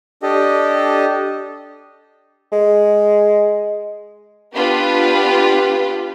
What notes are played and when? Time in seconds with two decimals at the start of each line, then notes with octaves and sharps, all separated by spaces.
0.23 D4 G4 A4 D#5
2.52 G#3
4.55 B3 D4 F4 G4 B4